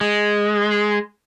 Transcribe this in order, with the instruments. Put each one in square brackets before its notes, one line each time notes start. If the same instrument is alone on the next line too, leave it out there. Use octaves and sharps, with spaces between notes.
[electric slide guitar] G#3